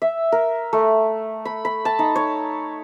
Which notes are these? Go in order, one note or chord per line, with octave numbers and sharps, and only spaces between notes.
E5
A#4
A3
B5
B5
A5
D#4
C#5